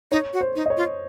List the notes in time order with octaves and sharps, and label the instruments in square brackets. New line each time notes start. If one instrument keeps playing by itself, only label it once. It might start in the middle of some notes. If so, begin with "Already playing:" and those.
[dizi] D#4 [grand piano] C#5
[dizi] F#4
[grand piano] C5
[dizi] D#4
[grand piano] D#5
C#5
[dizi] F4